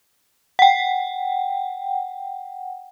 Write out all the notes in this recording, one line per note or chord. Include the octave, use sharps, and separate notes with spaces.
F#5 G5